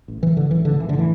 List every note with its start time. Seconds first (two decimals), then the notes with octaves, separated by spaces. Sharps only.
0.08 A1
0.22 A2 E3
0.37 A2 D3
0.51 A1 E3
0.65 A1 D3
0.80 A2 E3
0.89 D3
0.94 A2 E3